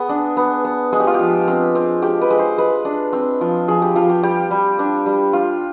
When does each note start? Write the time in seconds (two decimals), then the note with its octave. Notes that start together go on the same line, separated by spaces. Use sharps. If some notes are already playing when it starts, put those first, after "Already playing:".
Already playing: B3 G#4
0.09 D4
0.37 B3
0.65 B3
0.92 G#3 G#4
1.00 G4
1.07 F4
1.14 G4
1.19 F3
1.48 C4
1.75 C4
2.02 G#3 G4
2.21 B4
2.30 G#3
2.39 C5
2.58 G#3 B4
2.85 D4
3.13 C4
3.41 F3
3.68 F3 G#4
3.82 G4
3.96 F3 F4
4.10 G4
4.23 G3 G4
4.51 G3
4.79 D4
5.06 G3
5.33 F4